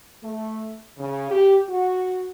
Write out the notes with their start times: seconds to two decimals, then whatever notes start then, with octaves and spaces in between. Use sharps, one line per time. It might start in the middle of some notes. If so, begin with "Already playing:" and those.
0.22 A3
0.98 C#3
1.30 G4
1.68 F#4